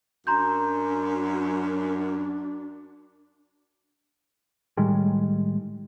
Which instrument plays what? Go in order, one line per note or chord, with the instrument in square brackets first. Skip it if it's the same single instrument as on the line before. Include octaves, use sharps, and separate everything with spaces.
[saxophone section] F#2 [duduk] D4 [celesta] A#5 C6 G6
[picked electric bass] A2 D#3 G3 G#3